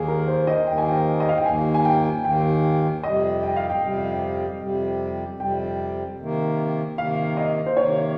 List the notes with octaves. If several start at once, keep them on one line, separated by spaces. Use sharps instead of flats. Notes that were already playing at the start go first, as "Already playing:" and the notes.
Already playing: D#2 D#3 A#3 G#4
A#4
C5
D#5
D#2 D#3 A#3 G5
G#5
G5
D#5
F5
G5
D#2 D#3 A#3 G#5
G#5
G5
D#2 D#3 A#3 G5
F2 C3 G3 D#5
G5
F5
G5
F2 C3 G3
F2 C3 G3
F2 C3 G3 G5
C3 D#3 A#3
C3 D#3 A#3 F5
D#5
C5
C3 D#3 A#3 C#5